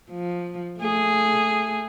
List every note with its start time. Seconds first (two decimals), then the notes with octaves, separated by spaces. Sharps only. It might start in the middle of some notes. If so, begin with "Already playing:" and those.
0.11 F3
0.81 A3 G#4